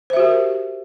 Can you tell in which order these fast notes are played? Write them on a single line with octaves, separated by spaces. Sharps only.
C5 E5 F#4 G4 A#4